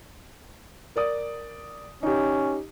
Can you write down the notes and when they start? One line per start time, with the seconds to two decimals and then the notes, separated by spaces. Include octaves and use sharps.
0.96 A#4 D5 D#6
2.03 C#4 D#4 G4